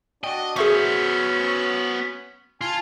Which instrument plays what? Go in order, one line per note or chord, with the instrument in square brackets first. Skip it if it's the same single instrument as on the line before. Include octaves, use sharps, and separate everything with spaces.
[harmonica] D4 F#4 [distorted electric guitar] D#5 [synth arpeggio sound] G5
[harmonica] F#3 [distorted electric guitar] B3 C5 [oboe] C#4 [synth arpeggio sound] G#4 E5 C#6
[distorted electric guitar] F4 [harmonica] G#5 A5